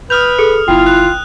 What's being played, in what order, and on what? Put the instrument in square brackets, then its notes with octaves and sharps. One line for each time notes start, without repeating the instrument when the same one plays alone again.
[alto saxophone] B4 [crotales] D#6 F6 F7 [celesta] G6
[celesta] G#4 A4 C#7
[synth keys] G1 E4 [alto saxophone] F4 [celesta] G5
[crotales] F6 F#6